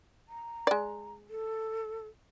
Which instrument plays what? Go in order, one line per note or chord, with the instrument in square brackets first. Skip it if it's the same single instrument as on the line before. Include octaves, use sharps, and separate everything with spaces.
[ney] A#5
[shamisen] G#3 D5
[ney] A4